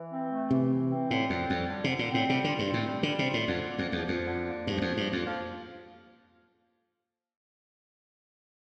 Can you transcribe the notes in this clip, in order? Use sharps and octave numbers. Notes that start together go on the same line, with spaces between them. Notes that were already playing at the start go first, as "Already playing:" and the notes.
Already playing: E3
C4
A3
C3 E3
E3
C4
A2 D3
F2 C4
F2 G3
D3
C3
D3
A#2
C4
A2
C3 G3
D3 F4
G2
C4
A2
G3
D3
G3
C3
F4
A2
F2 D3
A#3
F2
E2 F3
F2 F4
D3
A#3
G2 F3
E2
F2
F4
G2
F2 A#3
F3